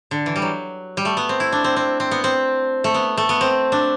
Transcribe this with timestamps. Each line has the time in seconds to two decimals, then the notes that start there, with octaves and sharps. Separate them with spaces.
0.11 D3
0.26 E3
0.36 G3
0.42 F#3
0.97 G3
1.05 A3
1.17 B3
1.29 C4
1.40 E4
1.52 D4
1.64 C4
1.76 C4
2.00 C4
2.11 B3
2.24 C4
2.84 A3
2.94 B3
3.17 A3
3.29 B3
3.41 C4
3.72 D4